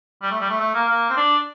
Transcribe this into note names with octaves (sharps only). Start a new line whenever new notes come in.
G3
A3
G3
A3
A3
A#3
A#3
C4
D4